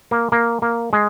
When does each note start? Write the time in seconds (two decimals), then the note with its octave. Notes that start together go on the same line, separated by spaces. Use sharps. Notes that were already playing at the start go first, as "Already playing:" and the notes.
0.11 A#3
0.32 A#3
0.62 A#3
0.93 G#3